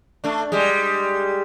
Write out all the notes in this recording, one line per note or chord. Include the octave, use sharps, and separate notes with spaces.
A3 D4
G3 G#3